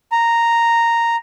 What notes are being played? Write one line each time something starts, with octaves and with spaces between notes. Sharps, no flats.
A#5